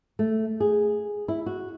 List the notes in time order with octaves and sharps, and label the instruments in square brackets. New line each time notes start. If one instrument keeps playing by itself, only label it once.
[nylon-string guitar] A3
G#4
E4
F#4